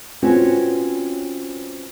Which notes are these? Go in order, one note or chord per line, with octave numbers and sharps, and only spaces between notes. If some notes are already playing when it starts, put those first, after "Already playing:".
C4 C#4 F4 F#4 B4 C#5